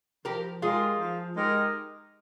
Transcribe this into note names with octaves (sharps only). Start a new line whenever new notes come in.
F3 G4 A#4
G#3 D#4 F4 G4 G#4 A#4
F3
G#3 D#4 G4 A#4